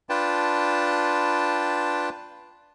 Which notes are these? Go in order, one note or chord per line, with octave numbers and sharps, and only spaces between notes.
D4 F4 B4 G5 A5